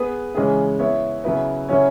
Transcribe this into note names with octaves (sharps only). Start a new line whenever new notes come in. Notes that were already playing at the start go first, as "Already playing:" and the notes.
Already playing: B3 G#4 B4
C#3 E3 G#3 C#4 G#4
B3 E4 C#5
C#3 F#3 B3 E4 B4
C#3 F#3 C#4 E4 C#5